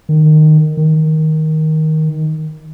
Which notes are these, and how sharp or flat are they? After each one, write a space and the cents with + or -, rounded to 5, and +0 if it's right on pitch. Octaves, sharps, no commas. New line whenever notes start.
D#3 -15
D#3 +10